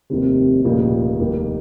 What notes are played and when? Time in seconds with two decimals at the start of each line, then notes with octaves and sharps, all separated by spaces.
0.10 F1 D#2 C3 D#3 G3
0.65 F1 D#2 A#2 C#3 G3
1.19 F1 D#2 D#3 G3